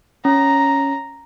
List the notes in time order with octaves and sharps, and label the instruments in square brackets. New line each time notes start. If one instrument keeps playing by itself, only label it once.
[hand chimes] C#4 [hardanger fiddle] A#5